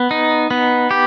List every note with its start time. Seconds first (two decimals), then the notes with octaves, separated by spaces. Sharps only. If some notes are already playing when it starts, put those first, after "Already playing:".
Already playing: B3
0.11 D#4
0.51 B3
0.91 G4